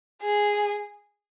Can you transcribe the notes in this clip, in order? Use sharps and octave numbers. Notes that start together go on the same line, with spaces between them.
G#4